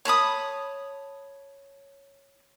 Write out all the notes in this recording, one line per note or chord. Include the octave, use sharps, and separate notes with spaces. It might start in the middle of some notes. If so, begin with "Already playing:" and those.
C#5 A5 B5 D#6